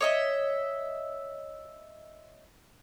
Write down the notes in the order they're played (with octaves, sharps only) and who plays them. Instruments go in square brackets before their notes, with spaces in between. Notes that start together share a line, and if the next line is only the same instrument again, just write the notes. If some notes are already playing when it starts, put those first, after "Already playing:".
[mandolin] C#5 D#5 E5